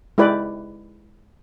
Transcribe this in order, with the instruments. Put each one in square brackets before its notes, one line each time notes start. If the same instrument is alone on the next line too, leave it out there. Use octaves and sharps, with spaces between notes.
[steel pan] G#3 E4 G4 B4 D5